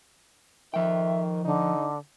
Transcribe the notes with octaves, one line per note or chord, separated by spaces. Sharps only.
D#3 F3 E5 G5
D3 D#4